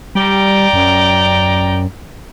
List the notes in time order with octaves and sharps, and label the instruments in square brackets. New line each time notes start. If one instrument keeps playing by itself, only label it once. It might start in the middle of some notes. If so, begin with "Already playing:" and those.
[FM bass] G3 [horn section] D5 G5 A#5
[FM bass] F#2